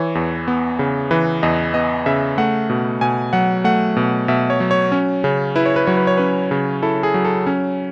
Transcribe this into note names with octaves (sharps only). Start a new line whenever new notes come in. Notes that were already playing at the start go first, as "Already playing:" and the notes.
Already playing: E3 C#5
E2
B3
C#3
E3 B4
E2 D#5
B3 D#5
C#3 E5
A3 F#5
B2
B2 G#5
F#3 F#5
A3 F#5
B2
B2 E5
C#5
F#3
C#5
C#4
C#3
E4 B4
C#5
B4
F#3 C#5
B4
C#5
C#4 B4
C#3
E4 A4
G#4
F#3
A4
C#4